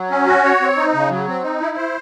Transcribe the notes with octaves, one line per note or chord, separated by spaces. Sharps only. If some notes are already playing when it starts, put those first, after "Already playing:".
Already playing: F#3
C#4
F#4
C#5
C4
D#4
C#3
F#3
C4
D#4
E4
C5